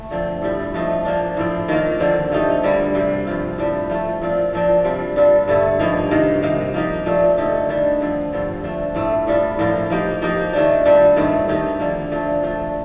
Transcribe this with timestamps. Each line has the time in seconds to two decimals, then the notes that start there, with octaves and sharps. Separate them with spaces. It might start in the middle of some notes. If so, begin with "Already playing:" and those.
Already playing: A3
0.11 D3 F3 C4
0.42 A2 G3 C4
0.74 F3 A3 D#4
1.05 F3 A#3 D4
1.37 A2 F3 C4
1.68 D#3 A#3 F4
2.00 D3 F3 C4
2.31 F3 A3 D#4 G4
2.63 G2 D3 G3 A#3
2.95 C3 G3 C4
3.27 G2 F3 C4 F4
3.58 A2 G3 D4 G4
3.90 F3 A3 C4
4.21 A#2 F3 C4 F4
4.53 A#2 F3 A#3 D4
4.84 C3 G3 C4 F4
5.16 A#2 G3 D4 F4
5.48 G2 D3 A3
5.79 G2 F3 A#3 D#4
6.11 C3 D#3 A#3
6.43 C3 D#3 A#3
6.74 F3 A#3 D#4 G4
7.06 A#2 F3 A3
7.37 D3 A3 D#4 G4
7.69 D#3 G3 D4
8.00 D3 F3 C4
8.33 G2 D3 F3 C4
8.63 F3 A3 D4
8.95 A2 A3 C4
9.27 A2 G3 D4 F4
9.59 A2 F3 A#3 F4
9.90 F3 A#3 D#4 G4
10.22 F3 A#3 D#4 G4
10.53 D#3 A3 D4
10.85 A#2 G3 D4 G4
11.16 G2 D#3 A3 C4
11.48 D#3 A3 D#4 G4
11.79 D3 F3 A#3
12.11 A#2 F3 A3 D4
12.43 F3 A3 D4